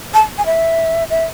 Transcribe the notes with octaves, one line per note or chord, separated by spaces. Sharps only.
A5
G#5
E5
E5